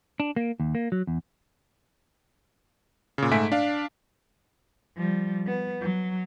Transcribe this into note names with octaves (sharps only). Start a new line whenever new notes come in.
D4
A#3
D#2
A#3
F#3
E2
A#2 C#3
G#2 A3 E5 G#5 B6 D7
D4 F5
F3 G3
B3
F#3